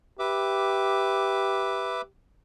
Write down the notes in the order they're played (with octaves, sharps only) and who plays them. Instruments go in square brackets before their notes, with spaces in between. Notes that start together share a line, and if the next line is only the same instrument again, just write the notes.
[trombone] G4 [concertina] B4 E5 D6